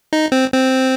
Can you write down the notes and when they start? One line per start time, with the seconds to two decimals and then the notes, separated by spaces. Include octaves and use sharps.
0.13 D#4
0.32 C4
0.53 C4